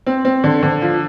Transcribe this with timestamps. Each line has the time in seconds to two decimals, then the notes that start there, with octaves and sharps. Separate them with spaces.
0.06 C4
0.25 C4
0.44 D3
0.63 D3
0.82 F3